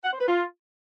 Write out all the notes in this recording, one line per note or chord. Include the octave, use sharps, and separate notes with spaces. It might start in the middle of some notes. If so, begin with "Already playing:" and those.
F#5
C5
B4
F4